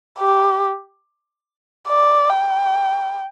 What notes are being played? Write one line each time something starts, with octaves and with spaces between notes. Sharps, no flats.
G4
D5
G5